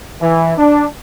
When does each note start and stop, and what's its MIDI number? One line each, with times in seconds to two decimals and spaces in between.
0.21 0.55 52
0.58 0.86 62